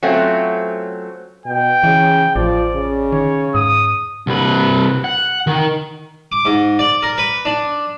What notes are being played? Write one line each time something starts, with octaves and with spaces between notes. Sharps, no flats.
F#3 A3 C4 C#4 F4
B2 G5
C#3 E3
A1 F3 D5
C#3
D#3 C#5
G#2 D#6
C2 B4
F#5
D#3
D6
G#2
D5
A#4
B4
D4